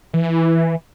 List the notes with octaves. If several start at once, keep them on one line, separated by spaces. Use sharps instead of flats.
E3